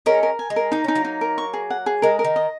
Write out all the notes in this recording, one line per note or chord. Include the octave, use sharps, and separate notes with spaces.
G#3 C#4 A#4
A#4
G#5
G#3
A#4
A#3 D#4
C#4 D#4
F#3 A#3
D#4
A#4
C#6
G#4
F#5
G#4
G#3 A#4
A#4
D#3
D#5